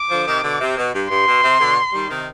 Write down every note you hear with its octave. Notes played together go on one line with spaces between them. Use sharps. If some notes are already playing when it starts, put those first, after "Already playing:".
Already playing: D6
D3 F3
C3 D#3
B2 D3
C3
B2
G2
G2 C6
B2
C3
B2 D3
D#3 G3
C3 D#3